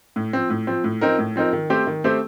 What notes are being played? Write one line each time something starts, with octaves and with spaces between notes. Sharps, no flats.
A2
F3 C4
A2
F3 C4
A2
F3 C4 D#4 A#4
A2
F3 C4 D#4 A#4
D#3
A3 C4 G4 C5
D#3
A3 C4 G4 C5